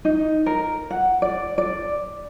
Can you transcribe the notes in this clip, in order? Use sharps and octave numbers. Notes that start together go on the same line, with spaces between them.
D#4
A#4
F#5
D5
D5